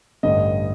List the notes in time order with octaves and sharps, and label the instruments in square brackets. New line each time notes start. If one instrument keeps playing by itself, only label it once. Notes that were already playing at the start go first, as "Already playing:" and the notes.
[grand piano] A1 G2 D3 D#5